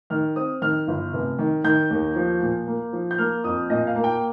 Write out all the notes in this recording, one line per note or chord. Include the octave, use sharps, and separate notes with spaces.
D#3 F6
C4 D#6
D#3 F6
G1
F1
D#3
D#3 G6
D#2
F3
A#2
A#3
F3
G6
A#3 F6
F2 D#6
A#2 D#5
F5
A#3
G5